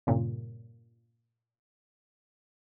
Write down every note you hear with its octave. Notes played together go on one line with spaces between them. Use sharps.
G2 A#2 C#3